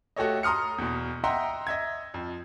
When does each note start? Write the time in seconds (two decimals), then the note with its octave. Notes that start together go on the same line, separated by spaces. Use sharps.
0.16 A3 F#4 G4 A4 C#5 D#5
0.43 A#5 C6 D#6 F6 C#7
0.78 E2 B2
1.24 D#5 E5 F#5 G5 A#5 C6
1.67 D#5 E5 G#6
2.14 F2